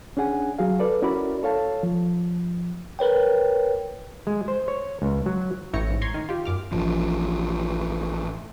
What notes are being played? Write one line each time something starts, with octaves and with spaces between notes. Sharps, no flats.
C#4 D4 G#4 F#5 G#5
F#3 F#4 G#4 F5
A4 B4 D5
C#4 E4 F#4 A#4 D5 B5
A4 C#5 F5 A5
F3
A#4 B4 C#5 G5
G#3
C5
C#5
C#2
F#3
A1 E4 C#5 G5 A#6 C#7
A1 G#2
A#5 C6 C#6 G#6 C7
D#3
F4 G4
F#2 D6 F6
A1 F3